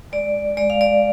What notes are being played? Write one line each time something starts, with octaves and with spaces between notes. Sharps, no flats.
G#3 D5
G#3 D5
F5
D5